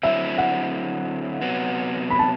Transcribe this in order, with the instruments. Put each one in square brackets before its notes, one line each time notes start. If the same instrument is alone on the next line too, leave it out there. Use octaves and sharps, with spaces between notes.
[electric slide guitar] D3 F#3 C4 E4 [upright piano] E5
[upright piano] F#5
[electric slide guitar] C3 F#3 B3
[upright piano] B5
A5